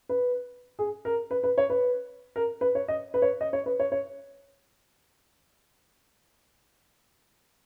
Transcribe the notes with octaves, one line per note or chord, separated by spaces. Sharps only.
B4
G#4
A#4
B4
B4
C#5
B4
A#4
B4
C#5
D#5
B4
C#5
D#5
C#5
B4
C#5
C#5